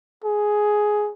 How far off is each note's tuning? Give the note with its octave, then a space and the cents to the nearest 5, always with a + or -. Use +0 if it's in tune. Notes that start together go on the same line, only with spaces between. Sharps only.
G#4 +10